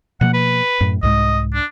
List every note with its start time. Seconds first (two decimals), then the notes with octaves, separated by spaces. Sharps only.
0.21 B2 F3 A#3 F#5
0.34 B4
0.81 F#2 A2
1.03 C2 G#2 G#3 D#5
1.54 D4